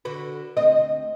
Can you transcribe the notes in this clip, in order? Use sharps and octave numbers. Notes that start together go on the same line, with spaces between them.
D3 F#4 B4
D2 C4 D#5